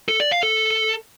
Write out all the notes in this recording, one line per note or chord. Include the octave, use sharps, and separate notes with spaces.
A4
D5
F5
A4